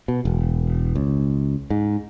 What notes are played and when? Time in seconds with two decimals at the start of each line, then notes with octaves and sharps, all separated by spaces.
0.08 B2
0.25 E1
0.95 C#2
1.70 G#2